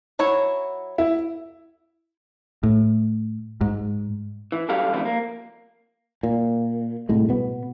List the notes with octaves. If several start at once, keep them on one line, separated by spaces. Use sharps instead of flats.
F#3 E4 C#5
E4
A2
G#2
E3
F#2 F#3 G3 G4 A4 F5
C3 D#3 F3 G3 A3 B3
A#3
A#2
C2 A2 G#3
B2 B3